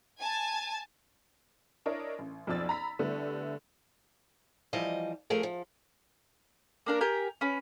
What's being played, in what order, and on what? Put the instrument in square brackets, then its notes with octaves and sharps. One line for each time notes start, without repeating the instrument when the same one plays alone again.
[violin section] G#5 A5
[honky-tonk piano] D4 E4 A#4 C#5 D#5
A1
B1 F2 F3 D5 E6 A6
A#5 B5 B6
D3 G3 A3 B3 E4
[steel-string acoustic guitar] E3 F3 G3 D#5
F3 A3 G#4 A#4
F3
[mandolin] A#3 D4 A#4
G4 A#4 G#5
C#4 B4